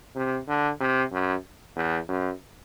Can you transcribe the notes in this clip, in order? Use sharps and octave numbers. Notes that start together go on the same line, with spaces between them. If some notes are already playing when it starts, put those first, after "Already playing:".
C3
D3
C3
F#2
E2
F#2